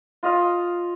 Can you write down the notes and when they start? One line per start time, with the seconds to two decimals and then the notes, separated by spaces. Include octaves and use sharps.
0.23 F4 D#5 F5